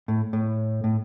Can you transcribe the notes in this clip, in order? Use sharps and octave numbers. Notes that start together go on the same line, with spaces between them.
A2
A2
A2